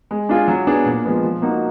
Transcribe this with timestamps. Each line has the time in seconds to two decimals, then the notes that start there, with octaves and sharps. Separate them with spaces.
0.11 G#3
0.29 D4 F4 G#4
0.48 F#3
0.67 B3 D4 G#4
0.86 A#2
1.04 F3 G#3 B3
1.23 F3
1.42 A#3 D#4 F#4